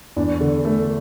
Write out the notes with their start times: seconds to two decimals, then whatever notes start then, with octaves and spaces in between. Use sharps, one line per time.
0.16 E2 D4
0.40 D3
0.65 A3